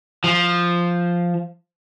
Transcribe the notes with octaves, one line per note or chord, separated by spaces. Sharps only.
F3